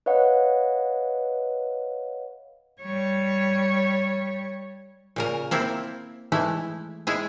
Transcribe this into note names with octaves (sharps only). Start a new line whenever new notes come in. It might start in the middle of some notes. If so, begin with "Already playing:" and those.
B4 C#5 D#5 F5 F#5
G3 C#5
A#2 C#3 A#4
A#3 C4 E4
E3 G#3 A3 E4
G#3 E4 G#4